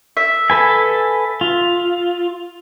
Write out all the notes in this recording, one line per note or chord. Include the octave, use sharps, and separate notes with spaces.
E5
A4 B4 G#5
F4